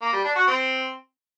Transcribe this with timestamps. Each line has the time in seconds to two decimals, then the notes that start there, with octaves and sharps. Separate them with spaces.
0.02 A#3
0.13 G3
0.24 D4
0.36 F#4
0.47 C4